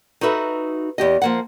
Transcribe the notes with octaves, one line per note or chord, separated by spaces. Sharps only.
D#4 F#4 A4 B4 E5
E2 G4 D#5
F3 A#3 F#5